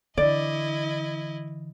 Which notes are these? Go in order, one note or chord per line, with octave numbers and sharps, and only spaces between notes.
D3 E3 E4 D5 D#5